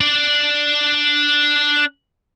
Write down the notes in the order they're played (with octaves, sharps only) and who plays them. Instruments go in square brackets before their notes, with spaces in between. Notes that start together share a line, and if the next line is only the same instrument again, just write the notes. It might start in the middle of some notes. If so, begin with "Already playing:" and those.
[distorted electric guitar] D4 D5